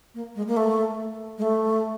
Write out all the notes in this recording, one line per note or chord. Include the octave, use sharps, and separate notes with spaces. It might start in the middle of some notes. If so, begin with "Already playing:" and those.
A#3
G#3
A#3
A3
G#3
A3